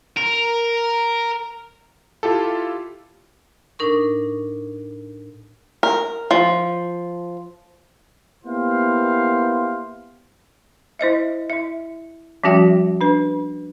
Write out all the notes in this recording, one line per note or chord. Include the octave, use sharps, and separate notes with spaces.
A#4
E4 F4 G4 A4
A2 D4 D#4 A#4 C#6
A#4
F3
A#3 B3 E4 G4 C5 F5
E4 C5 D#5 E5
E4 E5
F3 G3 C#4 F#4 E5 G5
D4 B4